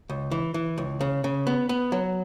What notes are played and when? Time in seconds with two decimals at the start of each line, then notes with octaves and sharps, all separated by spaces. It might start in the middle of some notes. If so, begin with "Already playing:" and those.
0.10 C#2
0.31 E3
0.54 E3
0.78 C#2
1.01 C#3
1.24 C#3
1.47 B3
1.69 B3
1.92 F#3